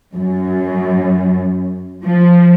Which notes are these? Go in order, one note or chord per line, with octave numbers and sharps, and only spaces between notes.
F#2
F3